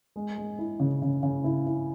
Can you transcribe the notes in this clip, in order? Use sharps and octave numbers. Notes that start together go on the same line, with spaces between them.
G#3
G#3
E4
C#3
C#3
C#3
E4
E4